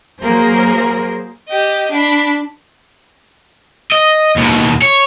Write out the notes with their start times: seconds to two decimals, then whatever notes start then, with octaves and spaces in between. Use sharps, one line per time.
0.21 F#3 A#3 G#4 A#4 C5
1.48 G4 D#5
1.91 D4 B5
3.92 D#5
4.37 D#2 B2
4.82 C#5